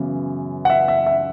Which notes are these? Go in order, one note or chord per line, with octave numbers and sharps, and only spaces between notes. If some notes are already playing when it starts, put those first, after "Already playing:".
Already playing: F#2 C#3 E3 B3
F#5
E5
E5
E5